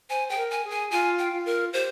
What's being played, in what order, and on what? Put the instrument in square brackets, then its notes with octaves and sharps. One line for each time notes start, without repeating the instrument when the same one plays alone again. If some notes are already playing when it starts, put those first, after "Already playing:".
[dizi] C5 [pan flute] G#5
[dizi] G#4 [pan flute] G5
[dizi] A#4
[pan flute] G#5
[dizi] G#4
[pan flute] G#5
[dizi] F4 [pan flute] G#5
[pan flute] G5
[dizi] F4
[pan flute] A#4
[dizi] G4 [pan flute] C5